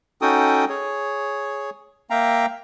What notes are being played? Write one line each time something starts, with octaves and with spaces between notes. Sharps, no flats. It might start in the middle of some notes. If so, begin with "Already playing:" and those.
C#4 D#4 F#4 A4 G5 D#6
G#4 C#5
A#3 E5 F5 G5 A#5